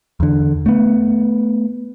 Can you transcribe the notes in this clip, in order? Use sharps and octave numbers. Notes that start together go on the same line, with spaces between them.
E2 D3
A3 B3